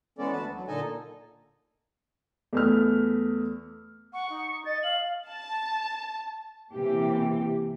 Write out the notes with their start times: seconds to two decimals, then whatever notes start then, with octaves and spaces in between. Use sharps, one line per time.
0.18 E3 G#3 B3 C#4 A4 D5
0.32 D2 F#4 B4 A5
0.53 F#3
0.68 A#2 D3 D#4 A4 D#5 G#5
2.53 E2 A3 F6
4.14 F#5 C#6
4.30 D#4
4.65 D#5 A6
4.83 F5 F#7
5.28 A5
6.73 C3 E3 A#3 G4